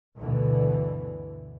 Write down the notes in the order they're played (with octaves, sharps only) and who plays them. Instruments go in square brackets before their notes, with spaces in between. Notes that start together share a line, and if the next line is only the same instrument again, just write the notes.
[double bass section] D2 G2 B2 D3 E3